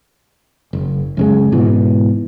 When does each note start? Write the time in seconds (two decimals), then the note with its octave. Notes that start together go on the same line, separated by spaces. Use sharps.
0.73 F#1
1.17 F#2 C#3 G#3
1.52 G#2 B2 E3